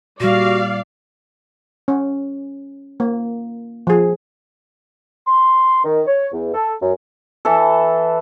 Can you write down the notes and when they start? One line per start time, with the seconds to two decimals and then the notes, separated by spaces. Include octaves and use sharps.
0.20 A#2 G3 F#4 D5 F5
1.88 C#4
3.00 A#3
3.87 F3 G#4
5.27 C6
5.84 D#3
6.07 C#5
6.32 E2
6.54 A4
6.81 F#2
7.45 E3 A4